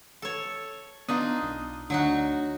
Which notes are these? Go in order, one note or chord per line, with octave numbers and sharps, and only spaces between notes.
A4 C#5
B3 D4 D#4 F4 D#6
B1
D2 F#3 D4 D#4 F#4